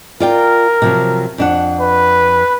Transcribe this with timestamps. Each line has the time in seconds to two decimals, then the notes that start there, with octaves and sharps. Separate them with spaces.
0.20 F4 A#4 D5 G5
0.82 C3 F3 F#3
1.38 F2 D4 F#5
1.81 B4